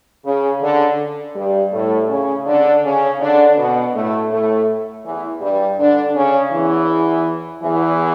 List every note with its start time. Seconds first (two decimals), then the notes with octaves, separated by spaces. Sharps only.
0.25 C#3
0.62 D3
1.36 G2 G3
1.72 A2 A3
2.09 C#3 C#4
2.46 D3 D4
2.83 C#3 C#4
3.20 D3 D4
3.57 B2 B3
3.94 A2 A3
4.31 A2 A3
5.05 E2 E3
5.41 G2 G3
5.79 D3 D4
6.15 C#3 C#4
6.52 E2 E3
7.63 E2 E3